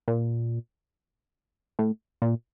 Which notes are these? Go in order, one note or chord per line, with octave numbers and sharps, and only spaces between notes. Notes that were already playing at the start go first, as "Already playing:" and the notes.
A#2
A2
A#2